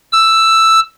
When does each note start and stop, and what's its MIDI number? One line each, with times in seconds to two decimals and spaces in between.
0.12 0.80 88